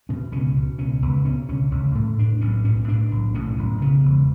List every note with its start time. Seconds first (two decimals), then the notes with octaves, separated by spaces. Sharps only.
0.09 B2 C#4
0.32 C#2 C#4
0.56 B2
0.78 C#2 C#4
1.02 C#2 B3
1.25 B2 C#4
1.49 C#2 C#4
1.71 C#2 C#4
1.95 A2 A3
2.18 A2 D4
2.41 B1 C#4
2.65 A2 C#4
2.88 A2 D4
3.11 B1
3.35 A2 C#4
3.57 B1
3.82 C#3 B3
4.05 E1